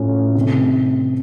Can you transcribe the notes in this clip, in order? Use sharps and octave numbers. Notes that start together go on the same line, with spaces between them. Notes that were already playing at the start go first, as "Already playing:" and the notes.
Already playing: A2 A3 C#4 F4
C3 D#3 A3